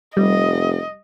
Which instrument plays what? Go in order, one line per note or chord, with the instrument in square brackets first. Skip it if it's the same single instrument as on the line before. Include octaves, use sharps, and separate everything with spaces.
[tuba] F1 [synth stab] G3 [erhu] D#5